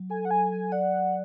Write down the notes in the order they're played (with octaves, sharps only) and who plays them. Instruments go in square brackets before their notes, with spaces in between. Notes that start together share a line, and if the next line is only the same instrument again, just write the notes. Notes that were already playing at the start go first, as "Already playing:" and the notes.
Already playing: [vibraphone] F#3
[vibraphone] A4 [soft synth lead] G#5
[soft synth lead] F#5
[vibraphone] F#3 [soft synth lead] G#5
[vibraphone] F#3 [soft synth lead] G#5
[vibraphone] D5 [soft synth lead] F#5
[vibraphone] D5